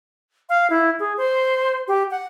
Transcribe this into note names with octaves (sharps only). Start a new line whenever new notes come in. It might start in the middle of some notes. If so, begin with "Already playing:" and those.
F5
E4
G#4
C5
G4
F#5